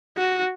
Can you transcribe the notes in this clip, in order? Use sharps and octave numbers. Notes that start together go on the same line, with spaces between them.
F#4